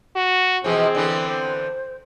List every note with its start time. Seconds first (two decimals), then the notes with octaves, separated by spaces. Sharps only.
0.16 F#4
0.64 B2 E3 F3 C4 G#4
0.95 D3 E3 B3
1.27 C5